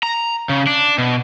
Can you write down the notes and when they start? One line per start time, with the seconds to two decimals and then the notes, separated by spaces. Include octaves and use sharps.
0.03 A#5
0.49 C#3
0.67 D4
0.98 B2